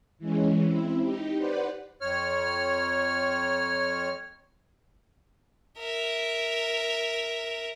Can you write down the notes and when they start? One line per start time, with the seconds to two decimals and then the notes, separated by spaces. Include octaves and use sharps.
0.19 E3 G#3 C#4
0.65 C4 E4
1.01 D#4 G4
1.37 B4 C5 D5 F#5
2.01 F2 C#5 F6
5.79 A#4 E5